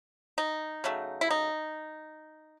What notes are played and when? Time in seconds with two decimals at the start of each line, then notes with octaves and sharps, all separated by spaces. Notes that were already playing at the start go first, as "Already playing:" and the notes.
0.38 D#4
0.84 C#3 F#3 A3
1.21 E4
1.30 D#4